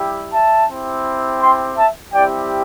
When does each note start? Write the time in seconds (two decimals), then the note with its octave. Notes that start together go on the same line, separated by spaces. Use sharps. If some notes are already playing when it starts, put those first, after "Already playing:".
Already playing: G3 E4 G4
0.32 E5 A5
0.68 C4 E4 G4
1.40 G5 C6
1.76 E5 A5
2.12 G3 C4 E4 G4 D5 G5